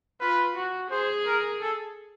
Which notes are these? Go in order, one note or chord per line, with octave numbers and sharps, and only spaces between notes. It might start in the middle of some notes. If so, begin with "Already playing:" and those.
F4 B4
F#4
G#4 C5
A#4
A4